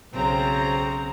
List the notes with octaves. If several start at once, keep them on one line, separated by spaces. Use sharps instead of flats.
B1 C#3 C4 A#5